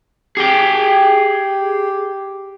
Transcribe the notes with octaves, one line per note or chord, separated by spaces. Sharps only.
G4 G#4 G5